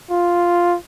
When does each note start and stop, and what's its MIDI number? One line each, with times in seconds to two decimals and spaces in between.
0.11 0.77 65